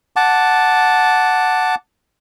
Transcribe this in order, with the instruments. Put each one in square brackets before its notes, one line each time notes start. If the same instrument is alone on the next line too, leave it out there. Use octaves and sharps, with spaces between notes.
[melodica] F#5 A5 D6